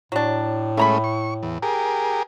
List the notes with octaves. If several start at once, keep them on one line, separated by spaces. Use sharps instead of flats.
A2 F#3 D4
G#3 A3 C#4 E4 A#5 B5
C#6
E2
G4 G#4 A#4